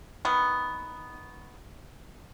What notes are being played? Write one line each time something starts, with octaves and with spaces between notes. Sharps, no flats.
D#3 B3